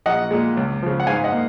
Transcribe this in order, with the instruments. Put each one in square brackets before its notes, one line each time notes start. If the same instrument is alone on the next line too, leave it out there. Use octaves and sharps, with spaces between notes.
[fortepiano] A#1 D#5 F#5
A#2 G#3
C#2
C#3 F3
F#5
G#2 F5 G#5
D#5 F#5
A#3